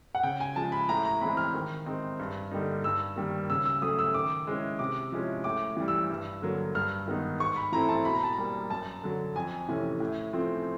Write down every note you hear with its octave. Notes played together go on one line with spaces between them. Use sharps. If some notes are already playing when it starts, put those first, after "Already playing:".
F#5
C#3 G5
G#5
F3 G#3 A5
B5
A2 A#5
A#5
E3 G#3 C4 B5
F6
D#3
G#3 C4 D#4
G2
D3 G3 A#3 D#4
G2 E6
D#3 G3 A#3
C#3 E6
E6
F#3 A3 C#4 D#6
E6
D#3 D6
G#3 C#4 E4
C3 D6
F3 G#3 C#4 E4
A2 D6
E3 G3
E6
G2
D3 F#3 A#3
G2 F6
D#3 G#3 B3 D#4
G#2 C#6
B5
E3 A3 C4 E4 A#5
A5
B2 B5
A#5
A5
A#5
G3 A#3
F#2 A5
D3 F#3
F2 G#5
C3 E3 A3 C#4
A2
F3 A3 C4 F4